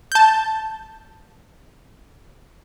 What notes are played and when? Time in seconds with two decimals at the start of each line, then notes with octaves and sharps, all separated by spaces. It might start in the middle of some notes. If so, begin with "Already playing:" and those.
0.12 A5 G6